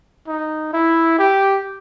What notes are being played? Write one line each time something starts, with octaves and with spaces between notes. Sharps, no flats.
D#4
E4
G4